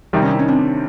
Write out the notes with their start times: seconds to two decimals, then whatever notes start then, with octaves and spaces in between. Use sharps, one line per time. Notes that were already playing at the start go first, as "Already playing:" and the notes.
0.13 C3 D#3 G3
0.22 C#4 D#4
0.30 D4 E4
0.39 C#4 D#4
0.48 C4 D4